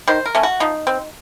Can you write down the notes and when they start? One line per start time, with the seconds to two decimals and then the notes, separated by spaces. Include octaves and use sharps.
0.08 D#3 C5
0.26 A#4
0.35 A3 C#4
0.43 F#4
0.60 F3 D#4
0.87 C4